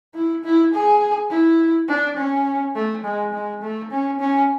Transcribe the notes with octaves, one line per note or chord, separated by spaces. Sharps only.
E4
E4
G#4
E4
D4
C#4
A3
G#3
G#3
A3
C#4
C#4